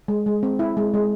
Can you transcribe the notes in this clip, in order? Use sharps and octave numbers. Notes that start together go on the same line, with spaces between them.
G#3
G#3
C4
E4
G#3
G#3